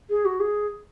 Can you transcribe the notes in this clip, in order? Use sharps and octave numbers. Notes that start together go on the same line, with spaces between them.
G#4
F#4
G#4